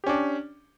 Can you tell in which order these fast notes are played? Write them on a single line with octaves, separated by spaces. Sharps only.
G4 C#4 D4